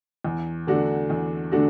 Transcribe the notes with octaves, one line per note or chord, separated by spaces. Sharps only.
E2
D3 A3 D4 F#4
E2
D3 A3 D4 F#4